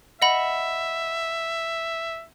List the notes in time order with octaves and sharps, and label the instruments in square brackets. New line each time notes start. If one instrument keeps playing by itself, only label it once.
[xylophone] D#5 F#5 B5 [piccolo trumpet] E5